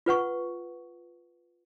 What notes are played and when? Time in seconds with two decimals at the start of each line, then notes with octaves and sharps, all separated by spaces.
0.06 F4 B4 F#5 C#6